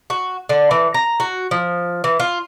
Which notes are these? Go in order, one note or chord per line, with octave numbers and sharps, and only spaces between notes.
F#4
D3
E3
A#5
F#4
F3
E3
F4